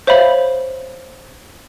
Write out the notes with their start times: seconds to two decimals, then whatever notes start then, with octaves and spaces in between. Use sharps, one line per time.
0.07 C5 C#5 E5 F5 B5